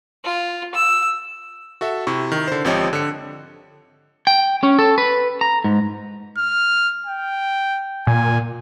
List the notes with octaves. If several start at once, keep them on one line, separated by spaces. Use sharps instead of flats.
F4
E6
F#4 A4 E5
C3 E4 C#6
D#3
D3 C5
G#1 F3 C4 G4 C#5 D#5
D3 C#7
G5
C#4
A4
B4
A#5
G#2
F6
G5
A#2 G#5